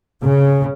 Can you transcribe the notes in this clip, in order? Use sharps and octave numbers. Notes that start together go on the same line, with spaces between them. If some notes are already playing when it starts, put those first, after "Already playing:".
C#3